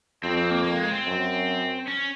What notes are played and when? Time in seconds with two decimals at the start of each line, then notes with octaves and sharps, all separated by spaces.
0.23 F2 C4
0.37 C4
0.51 A#3
0.64 A#3
0.78 G#3
0.92 C4
1.06 F#2
1.87 C#4